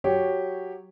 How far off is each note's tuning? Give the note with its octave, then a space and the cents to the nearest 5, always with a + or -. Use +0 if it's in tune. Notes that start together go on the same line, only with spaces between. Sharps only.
F#3 +0 G4 +0 C#5 +0